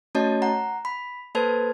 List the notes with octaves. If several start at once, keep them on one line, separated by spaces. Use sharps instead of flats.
A3 C#4 F#4 C#5 D#5 A5
F#5 A#5
B5
A#3 A4 B4 C5 A5 G#6